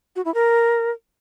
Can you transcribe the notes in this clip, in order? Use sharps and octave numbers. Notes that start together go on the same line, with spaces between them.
F#4
E4
A#4